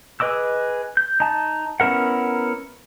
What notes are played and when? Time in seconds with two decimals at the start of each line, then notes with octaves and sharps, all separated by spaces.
0.20 G#4 B4 D#5 D6 E6
0.97 G6
1.20 D#4 A5
1.80 B3 C#4 E4 A#4 F#5